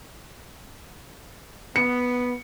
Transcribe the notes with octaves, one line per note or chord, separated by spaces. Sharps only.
B3 C#7